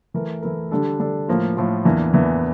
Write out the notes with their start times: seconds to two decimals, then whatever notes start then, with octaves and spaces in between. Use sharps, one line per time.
0.14 E3 A3 E4 A#4
0.42 E3 A3 E4 A#4
0.71 D3 G3 D4 A4
1.00 D3 G3 D4 A4
1.28 A2 F3 A#3 F4
1.57 A2 F3 A#3 F4
1.85 E2 E3 A#3 D4
2.14 E2 E3 A#3 D4